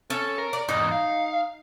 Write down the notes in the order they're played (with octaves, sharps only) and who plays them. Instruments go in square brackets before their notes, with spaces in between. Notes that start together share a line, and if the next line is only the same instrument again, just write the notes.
[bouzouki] C#4 [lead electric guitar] A4
[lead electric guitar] A#4
[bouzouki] D5
[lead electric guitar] E2 G#2 [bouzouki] D#4
[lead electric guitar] F5